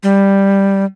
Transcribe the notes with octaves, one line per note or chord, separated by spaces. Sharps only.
G3